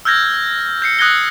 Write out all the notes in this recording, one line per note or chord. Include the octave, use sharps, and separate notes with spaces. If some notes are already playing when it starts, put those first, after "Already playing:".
E6 F6 G6 G#6 A#6
G6 C7 C#7
D#6 F#6 G#6 A#6 G7